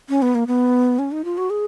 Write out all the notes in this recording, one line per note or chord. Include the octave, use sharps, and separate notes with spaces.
C#4
B3
A#3
B3
C#4
D#4
F4
F#4
G#4